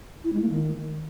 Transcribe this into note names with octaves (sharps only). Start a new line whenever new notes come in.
E4
G#3
A#3
D#3